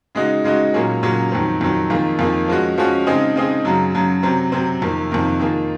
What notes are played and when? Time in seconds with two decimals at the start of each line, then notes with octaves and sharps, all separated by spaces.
0.15 C#3 G#3 D#4 F#4
0.44 C#3 G#3 D#4 F#4
0.74 A#2 F#3 A#3 C#4 G#4
1.03 A#2 F#3 A#3 C#4 G#4
1.32 F2 D#3 F#3 C4
1.61 F2 D#3 F#3 C4
1.90 F2 D#3 A#3 F4 G#4
2.19 F2 D#3 A#3 F4 G#4
2.48 F3 G#3 C#4 F#4
2.78 F3 G#3 C#4 F#4
3.07 C#3 G#3 C4 D#4 G#4
3.36 C#3 G#3 C4 D#4 G#4
3.65 F#2 C#3 F#3
3.94 F#2 C#3 F#3
4.23 C3 F#3 C4
4.52 C3 F#3 C4
4.82 F2 C3 D#3 A#3
5.11 F2 C3 D#3 A#3
5.39 D#3 A#3 F4 G#4